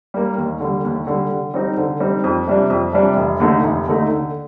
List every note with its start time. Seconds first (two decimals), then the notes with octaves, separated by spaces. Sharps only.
0.14 G3 A#3
0.38 D#2
0.60 D3 G3
0.84 D#2
1.07 D3 G3
1.31 D3
1.54 G3 C4 D#4
1.77 D3
2.00 G3 C4 D#4
2.24 F2
2.48 C3 G3 D4
2.70 F2
2.93 C3 G3 D4
3.17 F1
3.40 D#2 D3 A3 D#4
3.63 F1
3.87 D#2 D3 A3 D#4
4.10 D3